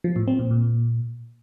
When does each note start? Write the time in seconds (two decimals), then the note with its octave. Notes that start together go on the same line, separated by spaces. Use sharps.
0.04 F3
0.16 A2
0.28 C4
0.39 A#2
0.51 A#2